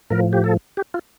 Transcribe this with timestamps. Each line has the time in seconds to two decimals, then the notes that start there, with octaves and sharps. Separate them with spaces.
0.10 A2 F3 A#4
0.33 G4
0.44 A4
0.77 G4
0.94 F4